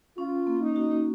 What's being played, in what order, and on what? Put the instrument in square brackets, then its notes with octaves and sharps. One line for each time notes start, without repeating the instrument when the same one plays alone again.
[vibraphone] C#4 [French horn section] F4
[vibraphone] A#3
[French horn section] D#4
[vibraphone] F#4